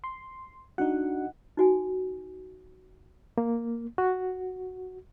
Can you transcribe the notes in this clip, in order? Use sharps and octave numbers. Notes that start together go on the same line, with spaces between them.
C6
D4 D#4 F#4 F#5
D#4 F#4 G#5
A#3
F#4